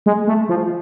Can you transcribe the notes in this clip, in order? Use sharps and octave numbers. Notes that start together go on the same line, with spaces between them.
G#3
A3
F3